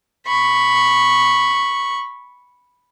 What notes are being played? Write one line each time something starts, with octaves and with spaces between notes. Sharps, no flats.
B5 C#6